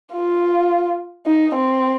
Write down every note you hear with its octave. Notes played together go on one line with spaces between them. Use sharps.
F4
D#4
C4